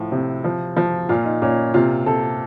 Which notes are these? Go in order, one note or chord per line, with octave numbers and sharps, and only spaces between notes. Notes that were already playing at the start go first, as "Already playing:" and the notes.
Already playing: A2 F3
C3
F3
F3
A#2 F4
D#4
A#2 C#4
C3 F4
C3 A4